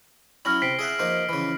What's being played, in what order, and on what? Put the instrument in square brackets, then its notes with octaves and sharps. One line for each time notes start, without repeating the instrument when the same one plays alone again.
[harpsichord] F#3 C#4 E4 [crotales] F6 A#6 F#7
[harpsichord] C3 [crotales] B6 C7 D7
[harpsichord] G#4 E5 F#5
F3 A#3 D#4
C#3 E3